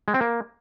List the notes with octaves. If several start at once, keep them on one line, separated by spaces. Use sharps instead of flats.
G#3
C4
A#3